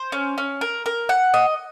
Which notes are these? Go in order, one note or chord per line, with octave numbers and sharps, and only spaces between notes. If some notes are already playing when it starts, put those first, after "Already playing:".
Already playing: C5
C#4
C#4
A#4
A#4
F#5
D#5